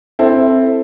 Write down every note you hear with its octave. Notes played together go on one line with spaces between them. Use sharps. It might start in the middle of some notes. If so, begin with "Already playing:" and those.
C4 E4 A4